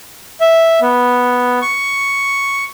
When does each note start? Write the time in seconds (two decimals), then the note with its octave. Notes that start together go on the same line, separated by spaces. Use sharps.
0.41 E5
0.81 B3
1.62 C#6